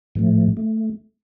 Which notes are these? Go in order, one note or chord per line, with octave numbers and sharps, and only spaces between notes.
A2 F3 A3
A3